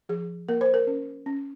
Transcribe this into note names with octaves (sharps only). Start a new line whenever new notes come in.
F3 G#4
A#3 A#4
C5
A#4
C#4
C#4